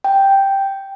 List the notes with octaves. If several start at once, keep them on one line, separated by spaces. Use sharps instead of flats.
G5